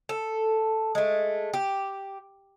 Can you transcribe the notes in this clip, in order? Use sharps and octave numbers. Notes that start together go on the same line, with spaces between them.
A4
G#3 A3
G4